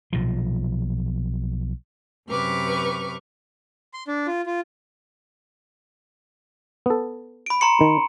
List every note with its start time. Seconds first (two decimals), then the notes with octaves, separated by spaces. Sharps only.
0.13 B1 A#2 F3
2.29 F#2 C3 B4 C#6 D6 F6
3.94 C6
4.08 D4
4.27 F4
4.46 F4
6.86 B3 A4
7.46 B5 D7
7.61 A#5 C6 C#7
7.81 D#3